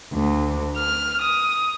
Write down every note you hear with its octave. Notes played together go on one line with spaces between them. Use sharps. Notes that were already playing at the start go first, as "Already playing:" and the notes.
D2
F6
D#6